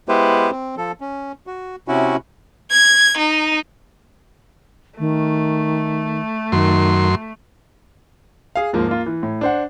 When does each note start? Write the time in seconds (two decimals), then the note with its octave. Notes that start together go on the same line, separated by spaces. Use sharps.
0.09 G#3 B3 E4 G4 B4 C5
0.51 C4
0.77 F3 A4
1.01 C#4
1.47 F#4
1.88 C3 C#4 E4 F#4
2.70 G#6
3.17 D#4
4.99 D#3 A3
6.52 F#2 D#3 C6
8.55 G#4 F5
8.73 D#2 G#2 F3 A#3
8.89 A#3 F4
9.06 E3
9.23 A2
9.41 D4 C5 F#5